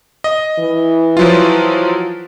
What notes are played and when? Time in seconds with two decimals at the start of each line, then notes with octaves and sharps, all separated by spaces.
0.24 D#5
0.59 E3
1.17 F3 F#3 F4